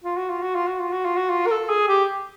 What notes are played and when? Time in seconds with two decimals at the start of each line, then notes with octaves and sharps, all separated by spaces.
0.04 F4
0.17 F#4
0.30 F4
0.42 F#4
0.55 F4
0.68 F#4
0.80 F4
0.92 F#4
1.05 F4
1.17 F#4
1.30 F4
1.47 A#4
1.51 A4
1.69 G#4
1.88 G4